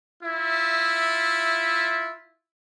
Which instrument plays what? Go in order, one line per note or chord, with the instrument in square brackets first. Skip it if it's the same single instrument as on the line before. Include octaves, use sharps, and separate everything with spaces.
[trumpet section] E4 F4 E5